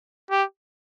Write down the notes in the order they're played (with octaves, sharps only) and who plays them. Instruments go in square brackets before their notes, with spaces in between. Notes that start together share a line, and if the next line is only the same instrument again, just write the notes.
[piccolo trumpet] G4